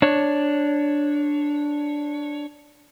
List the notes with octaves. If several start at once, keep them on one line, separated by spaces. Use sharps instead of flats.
D4 C#5